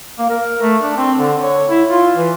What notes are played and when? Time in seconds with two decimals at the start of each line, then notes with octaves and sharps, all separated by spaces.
0.19 A#3
0.30 A#4
0.62 A3
0.81 D4
0.97 C4
1.17 D3
1.41 C#5
1.69 E4
1.90 F4
2.16 E3